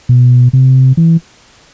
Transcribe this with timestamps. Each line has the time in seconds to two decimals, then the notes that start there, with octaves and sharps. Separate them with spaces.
0.09 B2
0.53 C3
0.97 E3